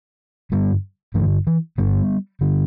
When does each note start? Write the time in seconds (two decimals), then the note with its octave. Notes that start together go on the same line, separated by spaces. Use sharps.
0.51 G2 D3 G3 B3
1.14 G2 D3 E3 A3
1.47 E3
1.78 G2 D3 G3 B3
2.41 G2 D3